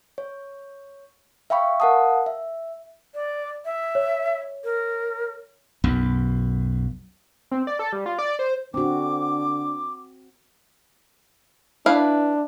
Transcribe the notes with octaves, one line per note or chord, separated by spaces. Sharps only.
C#5
E5 F5 G5 B5 C#6
A#4 F5 F#5 A5 D#6
E5
D5
E5
C#5
A#4
B1 F#2
C4
D5
A4
G3
F4
D5
C5
D3 C4 D4 F#4 D6
D4 E4 B4 F5